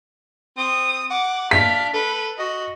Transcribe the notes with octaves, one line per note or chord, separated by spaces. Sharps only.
C4 D#6
F#5 D6
D4 F5 B6
A4 B4
F#4 D#5